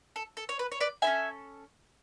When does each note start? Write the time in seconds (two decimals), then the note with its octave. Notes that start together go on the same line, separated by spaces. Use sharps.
0.16 A4
0.37 A4
0.49 C#5
0.59 B4
0.72 C#5
0.80 B4 D5
1.02 E4 A4 E5 G#5
1.07 C#4